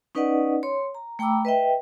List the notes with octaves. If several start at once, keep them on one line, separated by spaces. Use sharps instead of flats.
C#4 D#4 B4 D5 D#5 F#5
C#5 C6
A#5
A3 G5 A#5 B5 D6 E6
B4 D#5 E5 G5